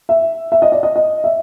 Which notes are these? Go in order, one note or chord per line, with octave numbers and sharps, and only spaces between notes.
E5
E5
D#5
D5
D#5
D#5
E5